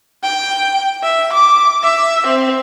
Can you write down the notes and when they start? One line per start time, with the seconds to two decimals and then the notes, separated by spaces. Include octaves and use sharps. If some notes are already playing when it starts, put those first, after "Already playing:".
0.23 G5
1.03 E5
1.33 D6
1.83 E5
2.26 C4